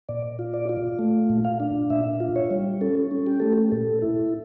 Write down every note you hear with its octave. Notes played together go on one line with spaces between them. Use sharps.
A#2 D5
F4
D5
F4
A3
A#2
F5
D4
A#2 E5
F4
C#5
G3
C#4 A4
C#4
G4
A3 A4
G4
A#2 A4
E4